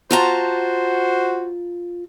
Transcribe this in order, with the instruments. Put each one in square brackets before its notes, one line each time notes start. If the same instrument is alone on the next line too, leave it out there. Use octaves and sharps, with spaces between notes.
[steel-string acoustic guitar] F4 A5 A#5 [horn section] F#4 C5